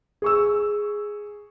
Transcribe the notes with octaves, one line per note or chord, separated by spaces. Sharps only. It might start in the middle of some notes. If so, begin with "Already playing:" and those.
G#4 C#6 E6